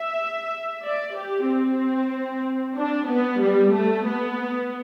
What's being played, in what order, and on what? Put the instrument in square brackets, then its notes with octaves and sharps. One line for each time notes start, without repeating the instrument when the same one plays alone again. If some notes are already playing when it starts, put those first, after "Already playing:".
Already playing: [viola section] E5
D5
G4
C4
D4
B3
G3
A3
B3